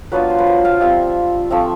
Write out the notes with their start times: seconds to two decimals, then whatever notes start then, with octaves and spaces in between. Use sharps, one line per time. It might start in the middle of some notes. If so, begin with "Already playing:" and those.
0.12 F#3 B3 D4 F4 B4
0.30 C5
0.39 B4
0.47 C5
0.65 F5
0.81 G3 C4 F4 E5
1.50 F3 A3 C4 E5